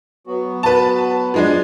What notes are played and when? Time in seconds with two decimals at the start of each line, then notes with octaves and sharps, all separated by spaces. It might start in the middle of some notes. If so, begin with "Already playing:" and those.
0.27 F#3 B3 F#4
0.63 B4 A5
1.34 F3 G#3 D4